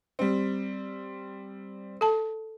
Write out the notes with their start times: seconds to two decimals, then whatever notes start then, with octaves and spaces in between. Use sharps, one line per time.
0.19 G3 C4
2.01 A4 A5